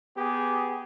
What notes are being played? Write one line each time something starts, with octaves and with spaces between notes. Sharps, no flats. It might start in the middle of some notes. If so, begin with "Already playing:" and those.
B3 G4 G#4